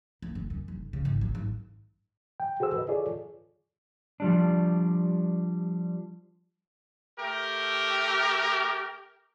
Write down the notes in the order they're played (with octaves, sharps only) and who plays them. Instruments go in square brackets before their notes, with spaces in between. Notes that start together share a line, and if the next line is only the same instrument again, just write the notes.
[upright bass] A#3
F#1
F#2
F1
C#3
G#1
F#3
G#1
[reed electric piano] G5
F#4 G#4 A4 C5 E6
B4 D#5
F4 G#4 A4 C#5 D5
[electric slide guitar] F3 G3 D4
[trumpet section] A3 G4 A#4